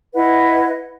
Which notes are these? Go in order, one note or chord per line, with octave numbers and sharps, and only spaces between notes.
E4 B4 D#5 F#5